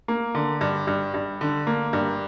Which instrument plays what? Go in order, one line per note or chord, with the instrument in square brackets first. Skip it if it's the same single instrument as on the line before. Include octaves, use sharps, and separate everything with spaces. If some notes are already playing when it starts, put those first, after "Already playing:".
[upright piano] A#3
D3
G2
G2
G2
D3
A#3
G2